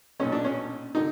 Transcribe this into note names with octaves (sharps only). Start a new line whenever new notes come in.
B1 A#2 C#4
D4
C#4
D3 D#4